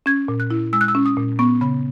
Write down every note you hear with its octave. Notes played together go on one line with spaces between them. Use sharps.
C#4 G#6
A#2
F#6
E4
G#3 E6
F#6
E6
C#4
D#6
A#2
B3 C#6
C#3 B5